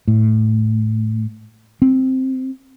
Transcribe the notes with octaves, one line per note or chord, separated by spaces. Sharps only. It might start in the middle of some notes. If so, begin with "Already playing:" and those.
A2
C4